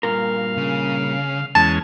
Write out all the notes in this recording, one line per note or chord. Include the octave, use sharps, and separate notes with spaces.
G2 A#2 A#4 F5
C#3
E2 G#3 C#4 A5